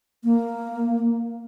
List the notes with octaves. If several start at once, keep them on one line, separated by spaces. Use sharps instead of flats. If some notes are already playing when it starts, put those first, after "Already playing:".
A#3